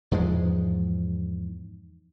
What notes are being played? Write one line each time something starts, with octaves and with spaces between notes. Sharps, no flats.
E2 G#2 F3 G#3